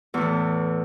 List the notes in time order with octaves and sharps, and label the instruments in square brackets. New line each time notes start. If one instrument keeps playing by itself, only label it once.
[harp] E2
A2
E3